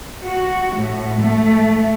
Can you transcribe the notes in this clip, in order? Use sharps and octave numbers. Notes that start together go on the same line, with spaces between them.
F#4
A2
A3